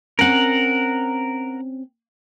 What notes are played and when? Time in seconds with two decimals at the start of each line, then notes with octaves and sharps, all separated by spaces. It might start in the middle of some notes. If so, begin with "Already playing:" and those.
0.19 C4 C#4 A#4 F#5